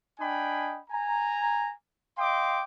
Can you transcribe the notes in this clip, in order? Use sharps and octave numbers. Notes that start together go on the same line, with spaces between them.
D4 D#5 G5 G#5 B5
G#5 A#5
D#5 F5 G5 C6 D6